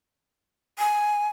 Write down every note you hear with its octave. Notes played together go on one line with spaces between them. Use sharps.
G#5